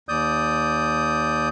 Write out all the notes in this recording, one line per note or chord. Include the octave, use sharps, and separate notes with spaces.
D#2 D5 D#6 G6